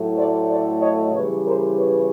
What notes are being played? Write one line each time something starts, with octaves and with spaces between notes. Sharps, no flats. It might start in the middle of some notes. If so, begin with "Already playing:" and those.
Already playing: A2 F#3 A3
C5 D5
C5 D5
C#5 D#5
C#3 E3 G3 B4 C#5
A#4 C5
B4 C#5